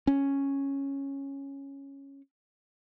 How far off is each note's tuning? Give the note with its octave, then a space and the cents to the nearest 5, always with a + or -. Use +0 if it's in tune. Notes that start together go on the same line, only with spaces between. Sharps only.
C#4 -5